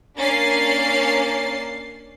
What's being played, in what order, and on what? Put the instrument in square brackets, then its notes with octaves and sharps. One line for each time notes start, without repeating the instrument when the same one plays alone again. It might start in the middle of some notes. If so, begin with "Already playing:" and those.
[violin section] A#3 C#4 D4 A6 C7